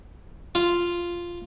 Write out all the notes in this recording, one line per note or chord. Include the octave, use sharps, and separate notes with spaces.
F4